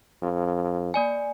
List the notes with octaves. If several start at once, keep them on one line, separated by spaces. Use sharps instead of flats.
F2
A#3 D5 G#5